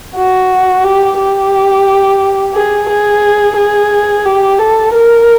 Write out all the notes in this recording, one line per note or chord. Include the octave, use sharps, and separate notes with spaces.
F#4
G4
G4
G#4
G#4
G#4
G4
A4
A#4